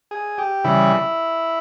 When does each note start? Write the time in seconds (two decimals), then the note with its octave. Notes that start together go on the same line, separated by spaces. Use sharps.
0.11 G#4
0.38 G4
0.64 C#3 E3 G3 E4